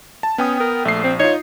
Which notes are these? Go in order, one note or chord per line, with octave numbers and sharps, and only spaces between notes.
A5
B3 C#4 G5 D#6
A#4
A#1 A3 C7
C4
D#4 F4 C#5